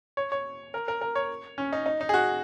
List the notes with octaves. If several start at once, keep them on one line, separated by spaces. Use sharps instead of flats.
C#5
C#5
A#4
A#4
A#4
C#5
C#4
D#4
D#4
D#4
G#4
F#4